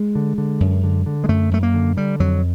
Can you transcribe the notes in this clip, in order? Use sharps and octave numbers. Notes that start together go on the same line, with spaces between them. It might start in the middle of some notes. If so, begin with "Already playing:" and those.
Already playing: G#3
D3
D3
F#2
D3
D3
G#3
F#2 A3
F#2 A3
A#3
D3
D3 G3
F2 F#3